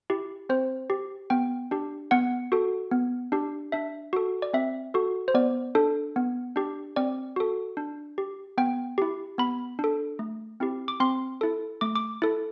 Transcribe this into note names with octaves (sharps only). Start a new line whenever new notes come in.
E4 G4
C4 C5
G4
B3 G5
D4 G4
B3 F#5
F#4 A4
B3
D4 G4
D4 E5
F#4 A4
D5
C4 E5
F#4 A4
C5
B3 D5
D4 A4
B3
D4 G4
C4 D5
F#4 A4
D4
G4
B3 G5
E4 G4
B3 B5
D4
A4
A3
C4 E4 G4
D6
C4 C6
E4 A4
A3 D6
D6
E4 A4